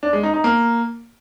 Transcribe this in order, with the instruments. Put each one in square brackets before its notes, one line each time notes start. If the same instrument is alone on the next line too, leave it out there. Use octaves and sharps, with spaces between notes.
[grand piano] D4
G#3
D#4
D#4
A#3